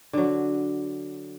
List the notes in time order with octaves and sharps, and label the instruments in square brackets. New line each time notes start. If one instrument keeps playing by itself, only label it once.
[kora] D3 F#3